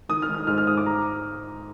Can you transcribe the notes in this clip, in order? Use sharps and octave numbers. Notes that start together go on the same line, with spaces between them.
D#3 D#6
F6
D#3
F6
G#2 F6
F6
G#2 D#6
D6
A#5